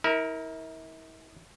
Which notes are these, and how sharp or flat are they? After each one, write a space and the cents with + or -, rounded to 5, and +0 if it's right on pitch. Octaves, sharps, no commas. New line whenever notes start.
E4 -40 A#4 +0